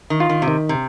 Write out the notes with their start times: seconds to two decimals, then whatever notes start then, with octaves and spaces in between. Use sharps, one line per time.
0.10 D#3
0.20 F4
0.29 D#3
0.42 C3
0.48 D#3
0.69 C3